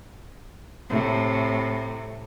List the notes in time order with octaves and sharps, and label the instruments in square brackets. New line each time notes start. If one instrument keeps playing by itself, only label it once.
[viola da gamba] A2 C3